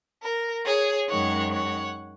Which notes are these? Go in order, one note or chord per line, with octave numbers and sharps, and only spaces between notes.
A#4
G#4 C#5
F#2 D#3 G#3 C#5 F#5
C#5 F#5